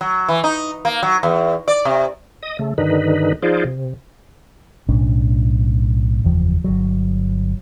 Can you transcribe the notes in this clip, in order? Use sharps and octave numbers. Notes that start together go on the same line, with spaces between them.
F#3
E3
D#4
A#3
F#3
E2
D5
C3
D#5 D#6
C#3 A3
G2 D3 D#3 D#4 B4
F3 D#4 F4 G#4 C5 D5
C3
B1 A2 C#4 D4
F#1 E2 F3
G1 F#3